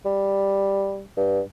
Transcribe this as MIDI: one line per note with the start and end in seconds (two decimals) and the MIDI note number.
0.05 1.03 55
1.17 1.41 43